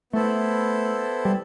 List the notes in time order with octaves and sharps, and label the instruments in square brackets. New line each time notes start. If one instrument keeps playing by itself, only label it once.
[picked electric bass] A3 [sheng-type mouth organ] B3 E4 A4 C5
[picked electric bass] G3